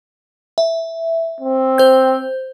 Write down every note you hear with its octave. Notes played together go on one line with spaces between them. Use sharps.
E5
C4
C5 G6